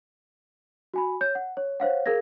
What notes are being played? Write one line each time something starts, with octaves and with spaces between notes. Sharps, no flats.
F#4 G#5 B5
C#5 G6
F#5
C#5
C5 C#5 F5 F#5
G#4 A#4 F5 G#6 A#6